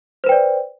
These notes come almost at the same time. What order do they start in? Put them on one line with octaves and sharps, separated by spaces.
C5 B4 G5 D5